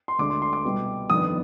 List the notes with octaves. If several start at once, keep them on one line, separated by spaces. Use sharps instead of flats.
C6
D2 D3 G#3 D4 D6
C6
C6
D6
C2 B2 G3
G1 F2 D#3 B3 D4 D#6